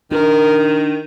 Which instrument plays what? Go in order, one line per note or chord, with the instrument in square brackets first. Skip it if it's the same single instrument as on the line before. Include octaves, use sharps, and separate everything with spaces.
[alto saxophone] D#3 [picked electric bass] D4 [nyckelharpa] A#4